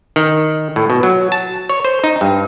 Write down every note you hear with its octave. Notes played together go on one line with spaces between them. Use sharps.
D#3
A2
B2
F#3
A5
C#5
C5
D#4
G2